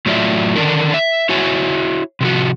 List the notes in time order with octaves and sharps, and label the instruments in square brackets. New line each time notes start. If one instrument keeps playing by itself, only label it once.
[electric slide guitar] A2 F#3 F4 D5 E5
D3 D#3 D4 E4 A#4
E5
E4 F#4 C#5 E5 G#5
C3 F3 F#4